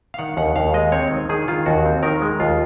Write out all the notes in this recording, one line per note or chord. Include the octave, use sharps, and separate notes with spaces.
F5
D#3 F#5
D#2 F#5
D#2 F5
G#3 D#5
C4 C#5
D#3
D#3 G#4
D#3 F4
D#2 F#4
C4
D#3 A#4
G#3
D#2 F4